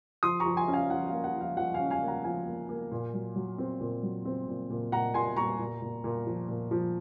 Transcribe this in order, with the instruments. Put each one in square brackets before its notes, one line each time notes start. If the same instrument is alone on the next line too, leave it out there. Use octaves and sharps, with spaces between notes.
[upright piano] F3 C6 D#6
A#5 C#6
F3
G#5 C6
C#4
F5 G#5
F3 F#5
F5
A#3
F#5
F3
F5
F3 F#5
F5 G#5
C#4
F5 G#5
A#3
F#5 A#5
F3 F5 G#5
A#3
A#3
A#2
F#3
F#3
C4
A#2
F#3
C4
A#2
A#2
A#2 F#5 A#5
A#2 G#5 C6
A#2 A#5 C#6
A#2
A#2
A#2
F3
A#2
F3